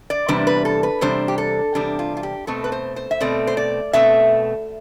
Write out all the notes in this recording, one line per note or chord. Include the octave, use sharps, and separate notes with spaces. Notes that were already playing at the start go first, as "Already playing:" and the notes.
D5
E2 C3 G3 D4 B4
B4
A4
B4
E2 C3 G3 D4 C5
G4
A4
E2 C3 G3 D4 G4
F4
F4
G4
B2 A3 C4 A4
B4
C5
C5
E5
B2 A3 C4 D5
C5
D5
B2 A3 C4 E5